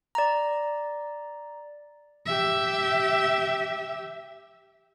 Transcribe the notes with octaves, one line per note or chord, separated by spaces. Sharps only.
D5 A#5
G4 E5